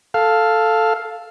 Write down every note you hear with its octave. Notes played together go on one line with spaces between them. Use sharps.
A4 F5